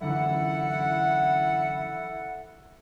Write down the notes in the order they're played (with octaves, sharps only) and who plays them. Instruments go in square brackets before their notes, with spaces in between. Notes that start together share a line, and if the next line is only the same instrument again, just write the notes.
[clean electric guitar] F#2 D3 E3 [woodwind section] E4 A4 F#5